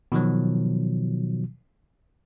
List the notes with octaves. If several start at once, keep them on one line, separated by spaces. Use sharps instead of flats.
B2 D#3 F3 F#3